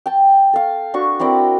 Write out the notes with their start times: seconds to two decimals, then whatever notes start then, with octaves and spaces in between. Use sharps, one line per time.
0.06 G5 A5
0.53 A4 F5
0.94 D4 F#4 C#6
1.20 C4 E4 A#4 D5